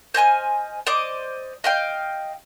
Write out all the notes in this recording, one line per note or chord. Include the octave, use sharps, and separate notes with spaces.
C5 D#5 G#5 F6
C5 D5 D#5 D6
D#5 F5 G5